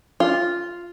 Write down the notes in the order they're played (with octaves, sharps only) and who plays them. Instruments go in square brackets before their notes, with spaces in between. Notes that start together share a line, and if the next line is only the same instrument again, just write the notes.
[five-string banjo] F4